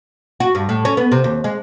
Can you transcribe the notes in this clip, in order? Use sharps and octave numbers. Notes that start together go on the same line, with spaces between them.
F#4
G2
A2
C#4
B3
C3
D#2
G#3